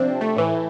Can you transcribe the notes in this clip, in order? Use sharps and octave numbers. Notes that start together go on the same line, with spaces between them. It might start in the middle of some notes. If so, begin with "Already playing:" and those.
Already playing: C3 F3 C4 D4
A3
A2 E3